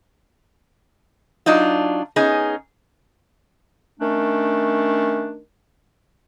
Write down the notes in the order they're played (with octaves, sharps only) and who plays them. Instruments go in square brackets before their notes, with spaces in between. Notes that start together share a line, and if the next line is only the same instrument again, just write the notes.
[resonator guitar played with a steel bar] F#3 D4 D#4 F4
B3 C#4 D#4 G#4
[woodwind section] D#3 A3 C#4 D4